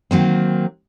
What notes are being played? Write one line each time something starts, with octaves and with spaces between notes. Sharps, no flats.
D#3 F#3 A#3 C4